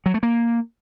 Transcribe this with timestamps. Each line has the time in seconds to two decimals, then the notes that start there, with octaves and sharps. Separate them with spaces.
0.06 F#3
0.14 A3
0.23 A#3